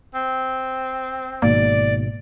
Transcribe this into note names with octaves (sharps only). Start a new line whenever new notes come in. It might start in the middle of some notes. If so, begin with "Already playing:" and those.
C4
G#1 G#2 B2 A#3 D5